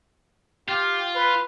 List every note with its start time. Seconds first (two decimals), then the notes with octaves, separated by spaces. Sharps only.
0.69 F4 G4
1.15 B4